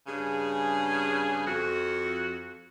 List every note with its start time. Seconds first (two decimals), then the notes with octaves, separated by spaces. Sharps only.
0.07 G2 C#3 G#4
1.45 F2 F#4